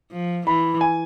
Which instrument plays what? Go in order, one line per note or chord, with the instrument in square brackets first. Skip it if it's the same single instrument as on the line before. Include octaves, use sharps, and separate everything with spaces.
[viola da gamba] F3
[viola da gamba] E3 [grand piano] B5
[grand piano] G#5